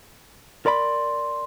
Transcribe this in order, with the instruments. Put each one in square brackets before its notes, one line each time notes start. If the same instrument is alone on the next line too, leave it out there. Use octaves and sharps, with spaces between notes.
[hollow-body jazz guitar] A#4 D5 B5 [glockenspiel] C6